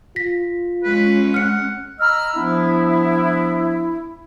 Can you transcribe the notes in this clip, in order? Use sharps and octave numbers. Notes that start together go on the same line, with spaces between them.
F4 A#6 B6
G#3 C#4 B4
F#5 F6 C#7
D#5 A#5 B5 E6 F6
F3 B3 D4 E4